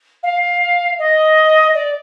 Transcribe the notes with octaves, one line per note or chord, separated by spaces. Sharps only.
F5
D#5
D5